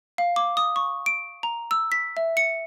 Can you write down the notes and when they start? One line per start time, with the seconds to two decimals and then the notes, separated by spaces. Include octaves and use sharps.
0.18 F5
0.36 D6
0.57 D#6
0.76 C#6
1.06 D7
1.43 A#5
1.71 E6
1.92 B6
2.17 E5
2.37 C#7